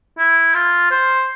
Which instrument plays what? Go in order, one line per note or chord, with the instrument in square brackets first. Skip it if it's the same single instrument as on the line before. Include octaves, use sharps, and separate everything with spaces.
[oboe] E4
F4
C5